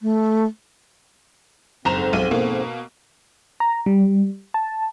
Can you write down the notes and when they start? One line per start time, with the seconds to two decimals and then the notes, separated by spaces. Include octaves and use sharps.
0.02 A3
1.85 F#1 F2 G#2 C4 A#5 E7
2.13 B1 D#7
2.31 B2 A#3
3.60 A#5
3.86 G3
4.54 A5